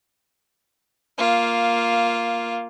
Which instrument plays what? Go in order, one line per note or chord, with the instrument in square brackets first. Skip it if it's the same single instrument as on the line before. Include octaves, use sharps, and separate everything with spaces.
[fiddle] A#3 F4